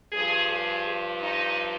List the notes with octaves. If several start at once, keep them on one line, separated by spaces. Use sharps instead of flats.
G2 F3 G#4
G#4
D#4